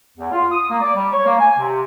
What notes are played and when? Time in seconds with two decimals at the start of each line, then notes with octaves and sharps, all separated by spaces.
0.17 E2
0.32 F4
0.52 D#6
0.70 A#3
0.81 D5
0.95 G3
1.13 C#5
1.25 A#3
1.39 G#5
1.58 C3